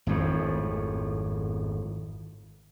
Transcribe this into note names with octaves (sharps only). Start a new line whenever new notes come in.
G#1 F2 A2